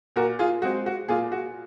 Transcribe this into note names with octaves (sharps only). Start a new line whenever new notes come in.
A#2 F#4 A#4
F4 G#4
G#3 C4 F#4
F#4
A#2 F4 G#4
F#4